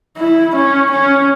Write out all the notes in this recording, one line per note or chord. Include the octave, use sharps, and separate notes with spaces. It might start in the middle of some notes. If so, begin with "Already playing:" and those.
E4
C#4
C#4